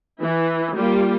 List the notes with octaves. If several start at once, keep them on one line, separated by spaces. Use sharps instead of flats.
E3 E4
G3 A#3 F4 G4